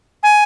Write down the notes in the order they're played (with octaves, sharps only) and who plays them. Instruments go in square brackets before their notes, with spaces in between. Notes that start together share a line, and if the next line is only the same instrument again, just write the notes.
[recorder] G#5